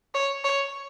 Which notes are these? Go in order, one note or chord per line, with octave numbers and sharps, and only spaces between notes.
C#5
C#5